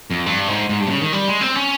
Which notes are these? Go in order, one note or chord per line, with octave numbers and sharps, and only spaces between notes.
F2
G2
G#2
G#2
G2
C3
C#3
D#3
G3
G#3
C4
C#4